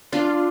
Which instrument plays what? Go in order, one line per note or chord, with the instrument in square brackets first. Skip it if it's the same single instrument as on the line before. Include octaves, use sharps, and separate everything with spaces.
[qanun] D4 [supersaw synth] F4